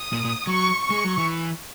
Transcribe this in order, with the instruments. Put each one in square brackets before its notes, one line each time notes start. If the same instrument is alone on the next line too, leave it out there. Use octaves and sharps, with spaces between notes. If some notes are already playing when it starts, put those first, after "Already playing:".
Already playing: [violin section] D#6
[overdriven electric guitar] A#2
A#2
[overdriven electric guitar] F#3 [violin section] C#6
[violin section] C#6
[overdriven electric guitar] G#3
F#3
E3